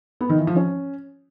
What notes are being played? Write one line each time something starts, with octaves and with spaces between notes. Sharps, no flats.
B3
D#3
E3
F3
C#4